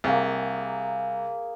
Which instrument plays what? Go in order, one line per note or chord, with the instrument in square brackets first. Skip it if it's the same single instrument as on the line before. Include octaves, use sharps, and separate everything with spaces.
[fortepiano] C2 [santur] A#3 G#4